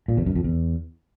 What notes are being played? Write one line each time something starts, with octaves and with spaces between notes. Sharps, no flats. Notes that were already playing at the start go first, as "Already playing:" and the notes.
A#2
E2
F#2
F2
E2